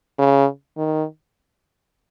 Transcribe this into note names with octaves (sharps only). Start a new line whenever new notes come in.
C#3
D#3